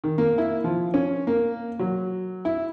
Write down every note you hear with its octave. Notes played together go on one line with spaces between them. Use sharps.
D#3
A#3
E4
F3
C#4
A#3
F#3
E4